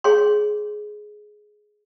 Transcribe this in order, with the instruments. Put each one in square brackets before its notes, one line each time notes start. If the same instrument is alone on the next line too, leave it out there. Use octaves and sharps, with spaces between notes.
[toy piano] G#4 C#5 G5 C6